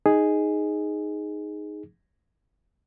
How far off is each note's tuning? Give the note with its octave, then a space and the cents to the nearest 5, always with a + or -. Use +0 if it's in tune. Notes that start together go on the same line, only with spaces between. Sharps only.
D#4 +0 G#4 +0